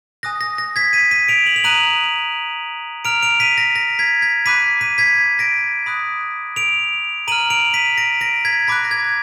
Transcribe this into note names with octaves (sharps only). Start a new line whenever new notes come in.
G#5 D#6 F#6 A#6
A#6
A#6
G#6 B6
B6 D#7
B6 D#7
D7 F7
F#7
F7
A#5 D#6 F#6 D#7 F#7
A#5 F6 D7 F7
D7 F7
B6 D#7
A#6
A#6
G#6 B6
G#6 B6
B5 D6 F#6 B6 D#7
B6 D#7
G#6 B6
A#6 D7
B5 D#6 F#6
D7 F7
A#5 F6 D#7 F#7
D7 F7
B6 D#7
A#6 D7
A#6 D7
G#6 B6
B5 D6 F#6 A#6
A#6
G#6